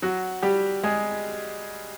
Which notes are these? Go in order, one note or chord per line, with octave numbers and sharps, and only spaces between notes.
F#3 F#4
G3 G4
G#3 G#4